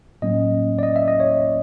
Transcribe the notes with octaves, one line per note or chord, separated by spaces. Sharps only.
A2 F#3 A#3 C#4 D#5
D5
D#5
E5
D#5
C#5